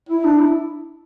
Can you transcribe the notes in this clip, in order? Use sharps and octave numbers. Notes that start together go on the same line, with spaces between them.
E4
D4
E4